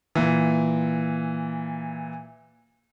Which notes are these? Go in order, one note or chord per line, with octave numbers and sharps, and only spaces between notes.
A#2 E3